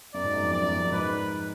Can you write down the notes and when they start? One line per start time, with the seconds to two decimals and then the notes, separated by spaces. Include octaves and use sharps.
0.14 F#2 D5
0.24 G#2
0.34 F#2
0.43 F2
0.53 F#2 D5
0.63 F#2
0.73 F2
0.82 F#2
0.92 G#2 B4